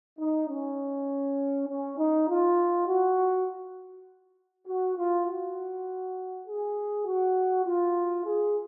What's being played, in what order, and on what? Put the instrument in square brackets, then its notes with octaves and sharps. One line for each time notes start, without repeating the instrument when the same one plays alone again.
[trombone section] D#4
C#4
C#4
D#4
F4
F#4
F#4
F4
F#4
G#4
F#4
F4
G#4